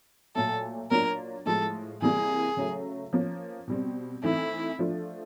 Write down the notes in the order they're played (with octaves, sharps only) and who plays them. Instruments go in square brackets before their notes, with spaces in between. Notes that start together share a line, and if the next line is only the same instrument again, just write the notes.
[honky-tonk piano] A#2 F#3 A3 [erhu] A4
[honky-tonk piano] F#3 A#3 D4 F4 [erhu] A#4
[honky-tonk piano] A2 F3 G#3 [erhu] A4
[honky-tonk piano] C3 E3 G3 A#3 [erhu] G#4
[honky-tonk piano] C#3 F#3 A3
F3 A#3 C#4
B2 G3 C4
[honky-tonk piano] E3 A3 C4 D#4 [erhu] E4
[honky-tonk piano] F3 A3 D4 F4